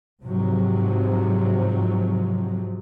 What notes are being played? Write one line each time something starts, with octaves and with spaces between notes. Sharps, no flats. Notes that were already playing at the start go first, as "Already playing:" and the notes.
G#2 C3 F3 F#3